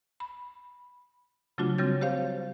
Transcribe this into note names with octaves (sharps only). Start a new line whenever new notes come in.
B5
C#3 F#3 A3 D4 F4 F#4
C#3 G3 C4 C#5 G6 A6
G4 C5 C#5 F5